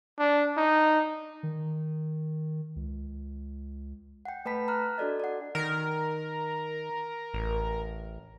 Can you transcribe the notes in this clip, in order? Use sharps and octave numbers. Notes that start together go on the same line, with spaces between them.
D4
D#4
D#3
C#2
F#5 G5
A3 B4 G5 A5 B5 B6
A#5 F6 F#6
D4 F#4 A4 D5 D#5
D5 F#5
D#3 A#4
A1